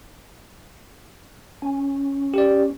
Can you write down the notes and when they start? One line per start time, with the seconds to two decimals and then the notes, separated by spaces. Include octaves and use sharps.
1.62 C#4
2.34 G4 D5